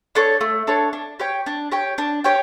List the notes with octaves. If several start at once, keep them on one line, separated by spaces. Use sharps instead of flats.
D4 A4 C#5
A3
D4 A4 C#5
D4
G4 C#5 G5
D4
G4 C#5 G5
D4
G4 C#5 G5